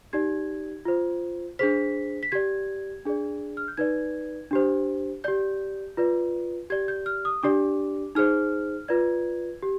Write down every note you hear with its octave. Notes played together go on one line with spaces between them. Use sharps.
D#4 G4 D5 G#6
F4 C5
D4 G#4 C5 B6
B6
G4 D5 G#6
D4 G#4 D5
F6
G6
D#4 B4 D5 G#6
D4 G4 C5
G4 D5 G6
F4 B4 D5
G4 D5 G#6
G6
F6
D#6
D4 G4 D5 D6
D#4 G#4 C5 F6
F4 B4 D5 G#6
G4